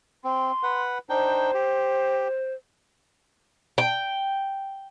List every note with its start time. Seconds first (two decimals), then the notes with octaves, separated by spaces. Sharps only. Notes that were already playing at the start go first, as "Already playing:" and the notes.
0.24 C4 C6
0.63 B4 F#5
1.10 D4 D#4 C5 G5
1.54 G4
3.78 G5